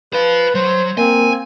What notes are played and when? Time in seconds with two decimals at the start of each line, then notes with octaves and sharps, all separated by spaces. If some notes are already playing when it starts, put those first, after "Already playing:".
0.13 B4 C5 F5
0.55 F#3 C5
0.98 A#3 C4 G#5